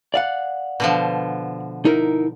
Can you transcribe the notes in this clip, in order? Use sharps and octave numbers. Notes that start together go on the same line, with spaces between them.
D5 F5 F#5
B2 D3 F3
D#4 E4 A#4